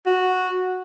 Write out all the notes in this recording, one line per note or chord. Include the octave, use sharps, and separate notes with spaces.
F#4